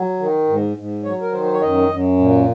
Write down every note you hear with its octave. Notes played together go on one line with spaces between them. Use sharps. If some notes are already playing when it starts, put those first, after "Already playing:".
Already playing: F#3
D#3
G#2
G#2
F#3 C#5
A#4
D#3 C5
C5
C#5
F#2 D#5
F#2
A#2